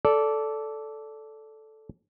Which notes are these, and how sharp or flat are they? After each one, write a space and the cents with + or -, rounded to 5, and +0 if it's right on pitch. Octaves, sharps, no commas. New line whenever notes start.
A4 -5 D5 -15